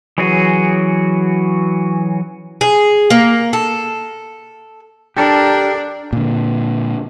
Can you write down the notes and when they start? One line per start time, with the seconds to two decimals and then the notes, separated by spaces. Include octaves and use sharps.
0.18 E3 F#3 C#4 F#4 G#4
2.61 G#4
3.10 A#3
3.53 A4
5.17 D4 G4 A4 A#4
6.13 A#2 D3